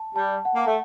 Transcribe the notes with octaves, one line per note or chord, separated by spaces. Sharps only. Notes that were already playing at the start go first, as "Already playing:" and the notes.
Already playing: A5
G3 A5
F#5
A#3
A3